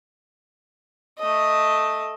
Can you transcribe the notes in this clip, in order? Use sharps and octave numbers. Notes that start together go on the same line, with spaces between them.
A3 D#5